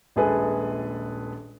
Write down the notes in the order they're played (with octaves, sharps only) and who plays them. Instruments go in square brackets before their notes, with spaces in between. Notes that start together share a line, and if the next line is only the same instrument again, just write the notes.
[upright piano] D#1 A#1 G#3 G#4 A4 B4